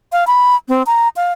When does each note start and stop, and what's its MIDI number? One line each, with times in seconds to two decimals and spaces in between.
0.12 0.27 77
0.27 0.55 83
0.69 0.83 60
0.86 1.08 82
1.16 1.32 77